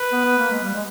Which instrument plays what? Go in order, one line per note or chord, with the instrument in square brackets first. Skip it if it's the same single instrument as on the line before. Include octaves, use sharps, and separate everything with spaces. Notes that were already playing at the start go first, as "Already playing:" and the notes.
Already playing: [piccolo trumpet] B4
[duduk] B3
B3
A#3
G#3
G3
G#3